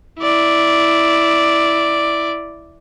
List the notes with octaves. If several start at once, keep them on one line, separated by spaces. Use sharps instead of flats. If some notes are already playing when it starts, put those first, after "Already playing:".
E4 D5